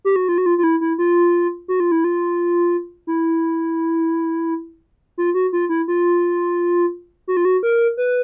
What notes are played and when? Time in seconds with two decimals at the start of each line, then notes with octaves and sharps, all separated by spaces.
0.05 G4
0.16 F#4
0.29 F4
0.38 F#4
0.46 F4
0.58 F4
0.64 E4
0.81 E4
0.98 F4
1.68 F#4
1.80 F4
1.92 E4
2.04 F4
3.07 E4
5.18 F4
5.34 F#4
5.53 F4
5.69 E4
5.88 F4
7.28 F#4
7.37 F4
7.45 F#4
7.63 A#4
7.97 B4